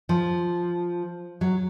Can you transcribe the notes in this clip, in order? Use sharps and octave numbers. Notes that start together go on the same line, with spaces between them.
F3
F#3